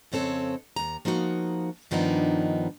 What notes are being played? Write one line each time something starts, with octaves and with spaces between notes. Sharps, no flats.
F2 C#3 C4 A4 C#5
D#2 A#5
F3 A#3 D#4 F#4
G2 D#3 F3 B3 D4 D#4